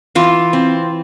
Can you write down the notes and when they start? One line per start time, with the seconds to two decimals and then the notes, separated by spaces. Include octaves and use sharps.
0.15 E3 F4
0.53 C4